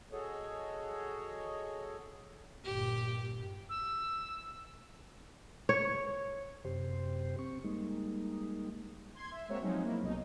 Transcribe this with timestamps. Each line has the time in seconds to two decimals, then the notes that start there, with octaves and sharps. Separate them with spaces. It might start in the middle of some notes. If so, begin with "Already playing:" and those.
0.12 F#4 G#4 A4 C#5 D#5
2.65 G1 A#2 G4
3.70 E6
5.69 C#5
6.65 F#2 C3 G4 C5
7.39 C4 C#6
7.64 G3 G#3 A#3 D#4
9.14 C6 G#6
9.32 E5
9.48 G#3 A#3 C4 F#4 C#5 E5
9.62 F3 F#3 G#3 C4 C#4 D#4
9.84 A#3 E4
10.02 C2 B2 D#4